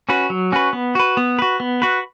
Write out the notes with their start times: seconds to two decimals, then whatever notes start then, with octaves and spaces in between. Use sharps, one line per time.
0.09 C#4 F#4 B4
0.30 F#3
0.52 C#4 F#4 B4
0.73 B3
0.95 F#4 B4
1.17 B3
1.39 F#4 B4
1.60 B3
1.82 F#4 B4